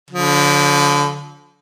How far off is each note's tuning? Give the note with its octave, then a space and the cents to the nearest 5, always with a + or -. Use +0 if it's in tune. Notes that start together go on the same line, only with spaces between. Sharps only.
D3 -30 F3 +30